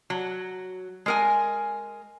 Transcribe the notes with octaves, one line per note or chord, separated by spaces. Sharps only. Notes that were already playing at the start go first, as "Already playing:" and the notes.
F#3
G#3 A#4 G#5